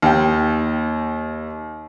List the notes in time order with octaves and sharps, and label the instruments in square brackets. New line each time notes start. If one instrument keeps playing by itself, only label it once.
[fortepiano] D#2 G5